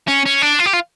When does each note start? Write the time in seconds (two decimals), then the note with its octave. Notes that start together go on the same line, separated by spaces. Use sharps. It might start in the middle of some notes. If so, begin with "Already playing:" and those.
0.08 C#4
0.26 C#4
0.42 D4
0.60 F4
0.66 G4
0.73 F4